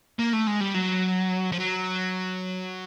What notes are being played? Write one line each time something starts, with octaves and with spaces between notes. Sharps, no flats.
A#3
A3
G#3
G3
F#3
F3
F#3